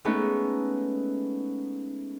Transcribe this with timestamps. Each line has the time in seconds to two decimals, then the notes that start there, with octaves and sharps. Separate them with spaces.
0.05 G#3 A3 B3 C#4 D#4